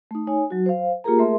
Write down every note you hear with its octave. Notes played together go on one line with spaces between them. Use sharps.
A3 D#4
D#4 C#5 G#5
F#3 F#4
C5 F5
A#3 F4 G4 G#4 A#4 A#5
A3 G#4 A#4 E5 C6